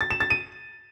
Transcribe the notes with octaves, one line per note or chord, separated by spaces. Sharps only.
A6
E7
A6
D#7